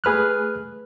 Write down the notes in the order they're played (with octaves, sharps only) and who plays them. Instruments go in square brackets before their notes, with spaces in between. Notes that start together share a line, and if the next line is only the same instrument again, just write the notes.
[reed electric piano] A3 G#4 B4 F6 F#6